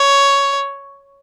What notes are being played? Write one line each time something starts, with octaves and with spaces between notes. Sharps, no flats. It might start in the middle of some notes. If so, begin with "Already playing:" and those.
Already playing: C#5